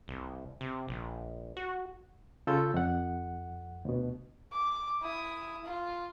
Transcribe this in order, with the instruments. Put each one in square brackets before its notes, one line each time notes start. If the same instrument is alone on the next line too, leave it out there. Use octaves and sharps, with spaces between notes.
[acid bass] C2
C3
A#1
F#4
[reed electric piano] C#3 F4 A4 C#5 E6 G6
F2 F#5
D2 B2
[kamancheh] D6
E4 D#6
F4